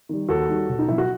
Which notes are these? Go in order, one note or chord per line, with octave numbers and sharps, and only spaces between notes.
D#3 G3
D#2 F#4 A4
D#3 G3
B1
D#4
B2 F#3 E4
F#4